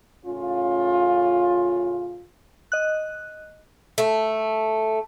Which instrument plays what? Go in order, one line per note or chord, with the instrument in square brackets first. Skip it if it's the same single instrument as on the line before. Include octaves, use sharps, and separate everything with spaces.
[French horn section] A2 C#3 C#4 F4
[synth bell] D#5 F#6
[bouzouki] A3